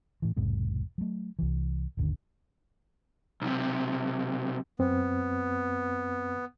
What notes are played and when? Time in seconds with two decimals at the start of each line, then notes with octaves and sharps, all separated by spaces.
0.22 A2 E3
0.37 E1 B1 G#2 C3
0.98 F#3 A3
1.39 C2 E3
1.97 G#1 D#2 D3
3.42 B1 C3
4.79 F#2 B3 C4